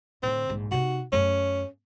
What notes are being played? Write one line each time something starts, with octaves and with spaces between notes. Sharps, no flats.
A2 D3 C4
A#1 G#2
C3 D#4 F#4
F#2 A3 C#4